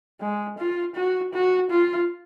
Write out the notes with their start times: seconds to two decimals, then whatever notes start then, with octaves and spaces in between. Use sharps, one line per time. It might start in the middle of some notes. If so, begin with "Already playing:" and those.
0.21 G#3
0.58 F4
0.95 F#4
1.33 F#4
1.70 F4